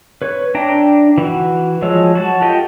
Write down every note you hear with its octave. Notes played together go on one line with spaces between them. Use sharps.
B4 C#5
D4 E5 G5 A#5
E3 F#4
F3 F#3 G#3 C#5 E6
F#4 A5
F4 G4 A4 D#5 G5